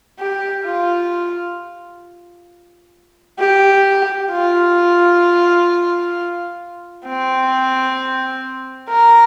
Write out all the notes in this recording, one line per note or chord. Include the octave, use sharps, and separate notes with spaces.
G4
F4
G4
F4
C4
A#4